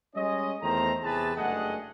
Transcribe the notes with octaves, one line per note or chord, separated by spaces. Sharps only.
G3 G#3 C#4 D#5
E2 D#3 A3 C4 C5 A#5
E2 C3 G#4 B4 A5
F#1 G2 A3 G#4 D#5 F#5